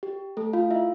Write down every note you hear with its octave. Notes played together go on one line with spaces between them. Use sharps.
G4
A3 A4
F4 F5
E4 E5